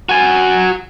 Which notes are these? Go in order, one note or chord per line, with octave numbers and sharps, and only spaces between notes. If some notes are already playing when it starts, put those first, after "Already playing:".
F#4 G#5